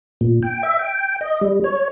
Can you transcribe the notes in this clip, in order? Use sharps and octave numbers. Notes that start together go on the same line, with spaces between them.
A#2
G5
E5
G5
D#5
G3
C#5